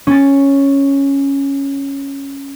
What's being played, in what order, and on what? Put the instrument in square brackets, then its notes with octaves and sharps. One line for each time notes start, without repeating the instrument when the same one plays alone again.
[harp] C#4 C#6 A6